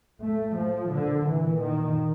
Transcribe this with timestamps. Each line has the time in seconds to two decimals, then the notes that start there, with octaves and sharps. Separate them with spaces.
0.22 A2 A3
0.57 A2 F3
0.93 A#2 D3
1.26 A#2 E3
1.62 A#2 D#3